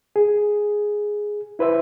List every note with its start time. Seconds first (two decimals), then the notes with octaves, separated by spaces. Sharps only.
0.16 G#4
1.59 E4 B4 C5 E5